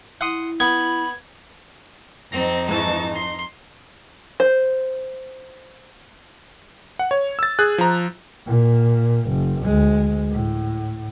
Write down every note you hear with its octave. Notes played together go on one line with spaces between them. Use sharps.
E4 F#5 C6 D#6
B3 B5 G#6
F2 C4 D#4 A#6
G#2 E3 A5 C#6
C6
C5
F#5
C#5
E6 A6
G#4 F#6
F3 A#5
A#2
F#1
D2 G#3
A2